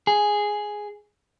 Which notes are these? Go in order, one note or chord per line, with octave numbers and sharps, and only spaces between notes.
G#4